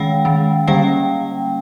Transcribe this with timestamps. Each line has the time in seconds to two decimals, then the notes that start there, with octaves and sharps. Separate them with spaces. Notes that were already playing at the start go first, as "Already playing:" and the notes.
Already playing: D#3 G#3 C#4 F5 G5
0.25 D#3 G#3 C#4
0.67 D3 G3 A#3 C#4 F5 G5